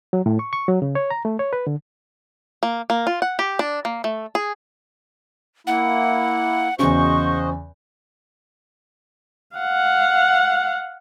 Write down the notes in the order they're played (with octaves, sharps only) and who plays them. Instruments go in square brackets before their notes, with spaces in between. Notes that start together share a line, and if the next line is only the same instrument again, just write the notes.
[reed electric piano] F#3
A2
C#6
C#6
F#3
C#3
C#5
A#5
A3
C#5
B4
D3
[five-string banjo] A#3
A#3
F4
F#5
G4
D4
A#3
A3
G#4
[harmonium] A#3 E4 [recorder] F#5
[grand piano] E2 C#3 [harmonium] F#4 C5 D#5 [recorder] C#6
[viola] F5 F#5